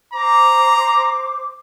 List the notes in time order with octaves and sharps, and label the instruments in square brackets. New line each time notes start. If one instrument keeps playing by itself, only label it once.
[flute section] C5 D6 [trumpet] A#5